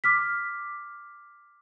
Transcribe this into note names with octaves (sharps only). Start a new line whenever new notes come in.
D6 F6 B6